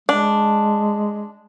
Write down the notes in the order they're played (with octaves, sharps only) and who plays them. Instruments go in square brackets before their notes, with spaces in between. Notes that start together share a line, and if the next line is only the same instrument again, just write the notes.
[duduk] G#3 [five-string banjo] D4